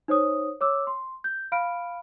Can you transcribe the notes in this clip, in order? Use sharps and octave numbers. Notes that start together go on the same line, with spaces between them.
D#4 C5 C#5 D#6
C#5 D6 E6
C6
G6
F5 B5 F6 D7